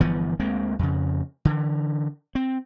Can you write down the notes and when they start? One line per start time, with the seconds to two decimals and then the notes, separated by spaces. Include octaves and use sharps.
0.01 G1 E3 F3 B3
0.40 D2 G#3 A#3 C4
0.79 F2 C#3
1.45 D3 E3
2.35 C4